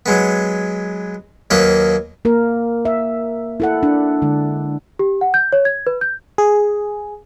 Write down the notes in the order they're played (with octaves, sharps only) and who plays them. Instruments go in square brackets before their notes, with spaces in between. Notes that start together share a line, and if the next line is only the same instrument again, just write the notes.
[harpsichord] F#3 G#3 B3
D#2 F#3 A#3 B4 D#5
[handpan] A#3 A#4
E5
E4 A4 F#5
D4
D3 G#3
[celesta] G4
F#5
G6
C#5
G#6
B4
G6
[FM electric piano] G#4